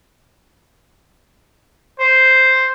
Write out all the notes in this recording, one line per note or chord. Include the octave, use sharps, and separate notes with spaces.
C5